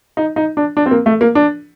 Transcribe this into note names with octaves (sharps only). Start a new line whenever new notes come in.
D#4
D#4
D4
D4
C4
A#3
A3
A#3
D4